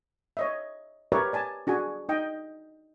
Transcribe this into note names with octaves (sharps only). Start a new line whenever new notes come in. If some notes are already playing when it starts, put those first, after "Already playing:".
C#5 D#5 E5
G4 A#4 B4 C#5 D5 E5
D5 G#5 A5
D4 F#4 G#4 G#5
D#4 D#5 G5